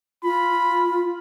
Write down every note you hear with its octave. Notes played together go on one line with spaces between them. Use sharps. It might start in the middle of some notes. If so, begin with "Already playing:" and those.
F4 B5